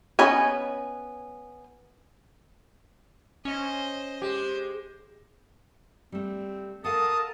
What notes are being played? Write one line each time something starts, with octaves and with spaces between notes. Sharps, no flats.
B3 C#4 B4 D#5 G#5
C#4 C5 D#5
G#3 G4 C5
G3 A3 C4
A4 A#4 F5 F#5 A5 D#6